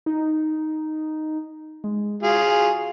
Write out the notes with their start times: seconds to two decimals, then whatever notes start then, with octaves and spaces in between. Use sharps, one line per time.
0.06 D#4
1.84 G#3
2.23 F4 F#4 G#4